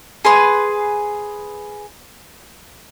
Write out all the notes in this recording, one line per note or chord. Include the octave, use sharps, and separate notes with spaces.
G#4 B4 C6